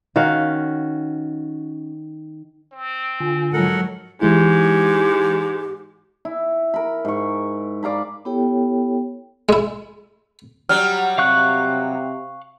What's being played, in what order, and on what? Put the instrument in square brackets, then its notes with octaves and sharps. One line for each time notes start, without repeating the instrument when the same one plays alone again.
[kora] D#3 C#4 F#4 F5
[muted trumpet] C4
[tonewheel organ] D3 F4 G#5
[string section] G#2 F#3 [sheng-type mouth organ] A4 A#4 F#5
[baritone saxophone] G#2 [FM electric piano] E3 G#3 E4 [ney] G4
[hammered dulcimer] E4
A#4 B5
G#2 C#6
D5 F5 A#5 B5
[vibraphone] B3 E4 G4 A4 C#5 G5
[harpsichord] G#3 E4
[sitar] F#3 G3 [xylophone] F6
[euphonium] C3 [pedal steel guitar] F5 C#6 F#6